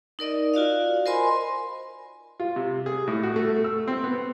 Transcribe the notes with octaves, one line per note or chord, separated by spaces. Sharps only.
D#4 A#4 D5 D#5
F4 F#4 D5 F5
A#4 C5 D#5 G#5 B5 C6
F4
C3
G#4
A2
F#4
A3
E6
C4
B3